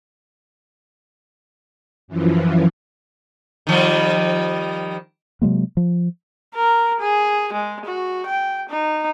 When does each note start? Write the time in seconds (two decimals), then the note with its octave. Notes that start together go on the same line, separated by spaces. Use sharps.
2.08 F#2 E3 F3
3.67 D#3 F3 G3
5.42 C3 F#3 G#3 A#3
5.77 F3
6.55 A#4
7.00 G#4
7.53 G#3
7.85 F#4
8.26 G5
8.69 D#4